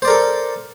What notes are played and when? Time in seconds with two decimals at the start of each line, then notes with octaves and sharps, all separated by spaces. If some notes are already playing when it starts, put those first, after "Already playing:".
0.02 C5
0.05 D5
0.08 A#4
0.10 A4